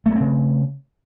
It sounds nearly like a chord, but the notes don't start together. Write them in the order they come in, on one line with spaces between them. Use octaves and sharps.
A3 A#3 C4 C#3